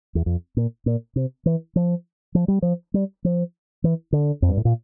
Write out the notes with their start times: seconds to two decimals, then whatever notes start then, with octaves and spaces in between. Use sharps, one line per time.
0.15 E2
0.26 F2
0.57 A#2
0.86 A#2
1.16 C3
1.46 E3
1.76 F3
2.35 F3
2.48 G3
2.62 F3
2.94 G3
3.24 F3
3.84 E3
4.12 D3
4.42 F2
4.49 G2
4.57 A2
4.65 A#2